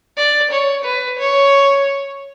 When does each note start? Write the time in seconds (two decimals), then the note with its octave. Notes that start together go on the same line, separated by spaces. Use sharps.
0.17 D5
0.51 C#5
0.85 B4
1.19 C#5